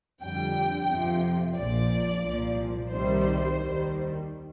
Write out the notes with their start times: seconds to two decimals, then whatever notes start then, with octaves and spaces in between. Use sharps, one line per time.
0.22 F2 D3 G3 G5
0.88 F2 C3 F3
1.56 A#1 A#2 F3 D5
2.22 C2 A#2 F3
2.89 C2 C3 D#3 G3 C5
3.57 D#2 D#3 G3